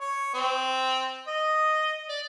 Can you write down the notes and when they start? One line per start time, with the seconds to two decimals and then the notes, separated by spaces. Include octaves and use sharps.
0.01 C#5
0.34 C4
1.28 D#5
2.09 D5